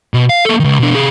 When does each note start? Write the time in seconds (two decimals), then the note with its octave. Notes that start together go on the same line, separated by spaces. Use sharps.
0.14 B2
0.29 F5
0.45 A#3 A4
0.60 C#2 D#3
0.80 B2 D4
0.95 C3 G#4